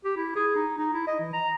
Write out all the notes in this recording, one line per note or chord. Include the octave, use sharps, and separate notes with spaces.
G4
E4
G#4
D#4
D#4
E4
D#5
E3
A#5